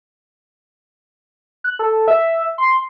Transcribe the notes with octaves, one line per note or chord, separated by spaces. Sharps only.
F#6
A4
E5
C6